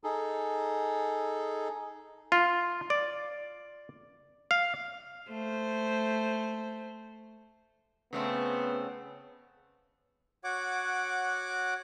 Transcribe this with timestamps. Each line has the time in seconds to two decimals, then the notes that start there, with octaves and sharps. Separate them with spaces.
0.04 D#4 G#4 A4
2.32 F4
2.90 D5
4.51 F5
5.29 A3 C5
8.13 C#3 A3 B3 C4
10.44 F#4 C#5 F#5 D6